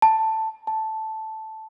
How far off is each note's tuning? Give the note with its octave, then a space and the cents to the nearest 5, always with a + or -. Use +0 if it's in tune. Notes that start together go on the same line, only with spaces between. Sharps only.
A5 +5
A5 -5